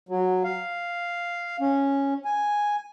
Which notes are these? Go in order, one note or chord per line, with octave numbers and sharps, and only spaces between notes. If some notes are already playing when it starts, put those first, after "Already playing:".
F#3
F5
C#4
G#5